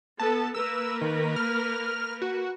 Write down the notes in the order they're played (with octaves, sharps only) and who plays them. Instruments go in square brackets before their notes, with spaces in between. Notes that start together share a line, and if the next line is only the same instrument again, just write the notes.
[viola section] B3 A4 [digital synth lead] A5
[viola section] A#3 A#4 B4 [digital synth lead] E6
[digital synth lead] D#3
F6
F#4